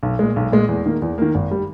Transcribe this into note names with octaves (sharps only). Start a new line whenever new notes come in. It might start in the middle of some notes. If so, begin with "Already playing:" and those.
B1
A#2 G#3
B1
A#2 G#3
E2
D#3 A#3
E2
D#3 A#3
G#1
G3